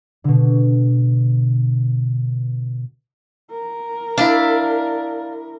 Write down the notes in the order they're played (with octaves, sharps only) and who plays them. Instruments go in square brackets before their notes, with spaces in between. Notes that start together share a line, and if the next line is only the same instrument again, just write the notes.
[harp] B2 D3
[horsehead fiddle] A#4
[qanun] D4 E4 [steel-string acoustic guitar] D5 F5